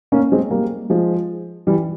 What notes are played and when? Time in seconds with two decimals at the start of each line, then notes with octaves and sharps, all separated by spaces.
0.12 A#3 C#4
0.32 G#3 C4
0.51 G3 A#3
0.90 F3 G#3
1.67 E3 G3